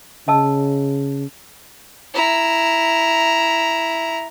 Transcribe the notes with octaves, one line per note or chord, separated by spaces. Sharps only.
C#3 D#5 A5 E6
E4 A#5